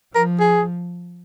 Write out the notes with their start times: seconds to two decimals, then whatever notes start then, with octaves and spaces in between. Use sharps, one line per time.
0.14 F3 A#4
0.39 G#4